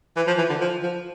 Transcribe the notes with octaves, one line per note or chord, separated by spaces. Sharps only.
E3
F3
E3
D3
F3
F3